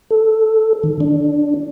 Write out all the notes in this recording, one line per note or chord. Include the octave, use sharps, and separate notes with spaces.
A4
D#3
D4